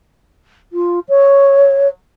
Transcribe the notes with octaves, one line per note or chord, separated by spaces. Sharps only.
F4
C#5